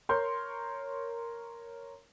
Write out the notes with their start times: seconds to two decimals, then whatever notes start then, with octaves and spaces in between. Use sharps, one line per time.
0.09 A#4 C#5 C6 G6